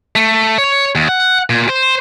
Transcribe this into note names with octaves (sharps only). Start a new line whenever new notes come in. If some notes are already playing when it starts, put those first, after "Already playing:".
A3
C#5
D#2
F#5
A#2
C5